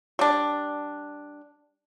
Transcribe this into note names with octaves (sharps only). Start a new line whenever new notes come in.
G3 D4